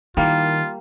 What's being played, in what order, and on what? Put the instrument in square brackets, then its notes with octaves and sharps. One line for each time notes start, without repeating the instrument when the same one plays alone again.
[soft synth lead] D#3 [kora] G3 A#3 [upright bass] E4 [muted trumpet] F4